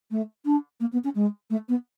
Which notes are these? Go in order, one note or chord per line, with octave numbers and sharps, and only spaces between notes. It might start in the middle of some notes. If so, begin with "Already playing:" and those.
A3
D4
A#3
B3
C#4
G#3
A3
B3